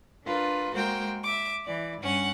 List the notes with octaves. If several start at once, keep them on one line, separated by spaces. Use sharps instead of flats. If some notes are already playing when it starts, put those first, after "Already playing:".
D4 F4 A#4 B4
G#3 A#3 F#4 A#4 C5 G5
E5 D6
E3 D5
G2 C#4 F#5